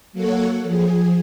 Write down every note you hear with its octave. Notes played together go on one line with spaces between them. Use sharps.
F#3 A#3 A4 C#5 F#5
F3 G#4